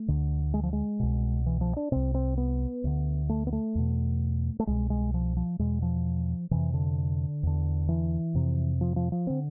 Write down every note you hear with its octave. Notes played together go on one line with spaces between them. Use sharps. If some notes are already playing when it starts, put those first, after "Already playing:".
Already playing: A3
D2 D3
G#3
F3
G#3
C2 B2
E3
F3
D4
C2 C3 C4
C4
B3
D2 D3
A3
B3
A3
E2 B2
A3
C2 B2 G#3
G#3
F3
F3
E2 B2 G#3
F3
F2 C3 E3
D3
E2 D3
E3
F2 C3
F3
F3
F3
D3 C4